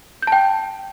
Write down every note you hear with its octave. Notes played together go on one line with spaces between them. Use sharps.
G5 A5 G6